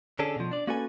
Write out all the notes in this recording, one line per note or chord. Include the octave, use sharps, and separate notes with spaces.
D3 C#4 D4 G#4 A4
B2 F3
D4 D5
A#3 C#4 F#4 A4 B4 G#5